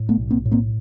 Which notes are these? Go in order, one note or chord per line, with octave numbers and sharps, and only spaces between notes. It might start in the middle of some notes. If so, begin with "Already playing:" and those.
Already playing: A2
A3 B3
B1
A#3 C4
A2
A#3 C4